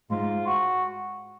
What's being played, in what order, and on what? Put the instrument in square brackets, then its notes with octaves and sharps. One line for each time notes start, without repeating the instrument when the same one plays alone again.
[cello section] G#2 [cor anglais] F4
[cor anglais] F#4